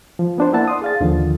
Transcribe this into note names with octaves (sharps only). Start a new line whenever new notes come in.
F3
B3 D4 C5
A#3 E4 E5 F#5 A5
D5 C6 D#6
G#4 F5 A6
D#2 D3 D#3 F3